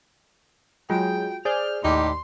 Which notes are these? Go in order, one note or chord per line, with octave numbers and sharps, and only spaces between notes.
F#3 G#3 F4 F#4 G5
G#4 C5 D5 F6 G6
D#2 A2 D#4 G4 D5 C6 D6